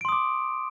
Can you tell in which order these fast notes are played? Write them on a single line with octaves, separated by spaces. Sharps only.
D7 C6 D#6 D6